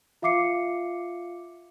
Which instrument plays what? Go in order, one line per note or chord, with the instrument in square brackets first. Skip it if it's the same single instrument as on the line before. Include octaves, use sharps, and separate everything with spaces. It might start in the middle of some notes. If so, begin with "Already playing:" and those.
[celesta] F4 E5 F5 D6 C7 C#7